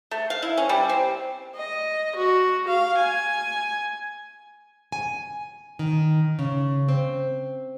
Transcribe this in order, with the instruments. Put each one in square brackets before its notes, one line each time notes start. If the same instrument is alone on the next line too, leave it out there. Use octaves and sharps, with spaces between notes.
[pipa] A3
F5
E4
C#4
G3
C4
[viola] D#5
F#4
F5
G#5
[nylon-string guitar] G#5
D#3
C#3
C4